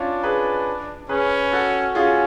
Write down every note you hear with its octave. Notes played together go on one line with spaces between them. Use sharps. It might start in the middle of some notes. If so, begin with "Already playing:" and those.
Already playing: C#4 D4 F4
G#4 B4
C#4 G#4 B4
F#4 A4
C#4 F4 G#4